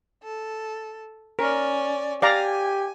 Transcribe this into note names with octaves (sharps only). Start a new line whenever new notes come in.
A4
C#4 A#4 D5
G4 D5 F5 G#5 A#5